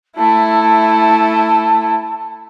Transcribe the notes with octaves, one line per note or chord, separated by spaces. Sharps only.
A3 E4 A5